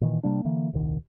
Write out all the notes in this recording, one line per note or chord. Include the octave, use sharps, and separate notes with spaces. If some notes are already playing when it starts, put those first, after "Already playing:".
A#2 D#3 E3
C3 G3 A#3 D4
D3 E3 A#3
D#1 C2 D#3